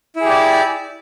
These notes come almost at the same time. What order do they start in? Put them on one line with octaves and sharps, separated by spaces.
E4 G#4 G4 D5